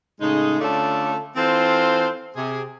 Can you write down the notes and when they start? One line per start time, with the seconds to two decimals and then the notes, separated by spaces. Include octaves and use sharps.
0.21 A2 C#3 G#3 D#4
0.60 D3 A3 C#4 F4 A4 D5
1.36 E3 C4 F4 A4 C5
2.36 C3 G#4